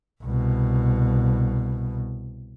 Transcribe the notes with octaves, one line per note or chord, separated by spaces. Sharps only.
C2 B2